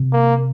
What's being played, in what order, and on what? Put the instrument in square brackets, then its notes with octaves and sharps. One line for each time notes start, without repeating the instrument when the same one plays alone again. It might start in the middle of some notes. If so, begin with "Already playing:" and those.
Already playing: [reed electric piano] C3
[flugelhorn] A#3